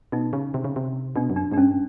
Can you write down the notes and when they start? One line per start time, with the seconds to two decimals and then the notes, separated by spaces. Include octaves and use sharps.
0.12 B2 D#4
0.33 C#3
0.54 C3
0.64 C#3
0.76 C3
1.16 B2 D4
1.30 F#2
1.36 D4
1.52 G#2 D4
1.57 G2 C#4